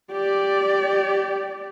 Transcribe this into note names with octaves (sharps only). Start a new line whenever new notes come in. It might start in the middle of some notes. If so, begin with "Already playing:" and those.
G4 D5